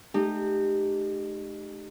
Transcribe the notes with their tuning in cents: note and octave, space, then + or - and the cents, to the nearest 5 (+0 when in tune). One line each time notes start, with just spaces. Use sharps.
A3 -35 D#4 -30 G4 +0